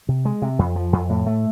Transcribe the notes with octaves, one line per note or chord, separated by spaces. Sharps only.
C3
G#3
C3
F2
F3
F2
A2
A3